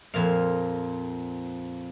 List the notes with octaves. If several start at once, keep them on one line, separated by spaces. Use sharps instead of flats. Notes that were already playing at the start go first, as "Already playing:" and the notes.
F2 A#2 F5